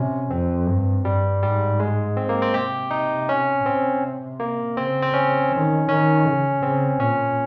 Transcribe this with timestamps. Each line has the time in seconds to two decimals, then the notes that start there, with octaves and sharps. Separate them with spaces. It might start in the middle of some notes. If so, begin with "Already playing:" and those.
Already playing: C3 C#4
0.31 F2 C4
0.68 G2
1.05 G2 G3
1.42 G#2 G3
1.80 G#3
2.17 C4
2.29 A#3
2.42 C4
2.54 C3 G4
2.91 D#4
3.29 C#4
3.65 C3 C4
4.40 A#3
4.77 C#3 C4
5.02 C4
5.14 C#4
5.52 D#3
5.89 D#3 C#4
6.25 C#3
6.62 C#3 C4
7.00 A#2 C#4